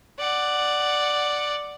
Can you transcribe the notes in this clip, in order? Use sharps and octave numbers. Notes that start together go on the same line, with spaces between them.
D5 F#5